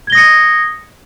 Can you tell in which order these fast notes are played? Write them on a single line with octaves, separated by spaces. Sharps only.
G#6 G7 A#6 D#6 C#7